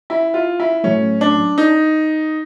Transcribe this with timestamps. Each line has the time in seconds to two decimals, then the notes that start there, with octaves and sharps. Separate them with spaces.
0.10 E4
0.34 F4
0.60 E4
0.84 A2 F#3 A3 C#4
1.21 D4
1.58 D#4